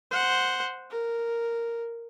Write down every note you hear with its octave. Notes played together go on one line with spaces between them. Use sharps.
C5 F#5
A#4